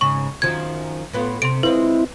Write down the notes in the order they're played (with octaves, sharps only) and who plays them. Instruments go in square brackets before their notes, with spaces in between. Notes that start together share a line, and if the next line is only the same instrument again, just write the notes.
[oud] G#2 C#3 [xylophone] C#6
[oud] F#2 D#3 F3 [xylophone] G#6
[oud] A2 B3 F4
[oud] C3 [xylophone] C6 D7
[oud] G#3 C4 F4 [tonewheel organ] E4 [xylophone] B4